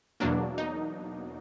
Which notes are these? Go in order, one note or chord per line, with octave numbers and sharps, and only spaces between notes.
E2 B2 F#3 A#3 D4
D#4